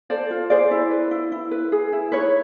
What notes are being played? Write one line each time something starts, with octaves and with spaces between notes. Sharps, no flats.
A4 C5 D5
F4
G#4 C5 D5
E4
B4
E4
E4
B4
G#4
E4
D#4 B4 C#5